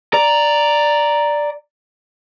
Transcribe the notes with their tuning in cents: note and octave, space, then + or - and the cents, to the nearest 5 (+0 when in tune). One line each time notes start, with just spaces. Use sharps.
D5 +0 A#5 +0